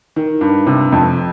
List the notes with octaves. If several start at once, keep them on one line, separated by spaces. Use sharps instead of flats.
D#3
G2
C3
F2